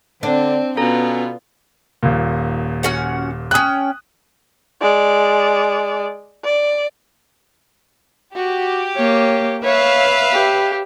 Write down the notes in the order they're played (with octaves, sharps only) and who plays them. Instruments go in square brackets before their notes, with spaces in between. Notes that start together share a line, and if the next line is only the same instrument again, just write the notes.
[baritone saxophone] D3 [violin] C4 [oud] D4
[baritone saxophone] B2 [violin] B3 F4 [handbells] C#4 A4 A#5
[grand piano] D#1 A#2
[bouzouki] C#4 F#4 F#5
[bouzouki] C#4 G5 [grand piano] D#6 F#6
[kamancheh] G#3 D5
D5
[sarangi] F#4 [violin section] G4
[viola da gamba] A#3 [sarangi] C#5
[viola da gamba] B4 [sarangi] C#5 [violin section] E5 F5
[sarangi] G4